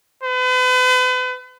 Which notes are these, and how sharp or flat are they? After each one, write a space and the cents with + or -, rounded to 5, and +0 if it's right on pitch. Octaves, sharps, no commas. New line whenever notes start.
B4 +40